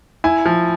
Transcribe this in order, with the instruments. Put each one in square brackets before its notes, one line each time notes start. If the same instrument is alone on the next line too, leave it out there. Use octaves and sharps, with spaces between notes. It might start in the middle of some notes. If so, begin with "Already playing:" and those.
[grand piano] E4 G#5
F3